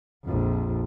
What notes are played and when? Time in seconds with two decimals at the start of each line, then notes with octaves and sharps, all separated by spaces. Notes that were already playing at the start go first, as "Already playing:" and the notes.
0.25 A#1 F2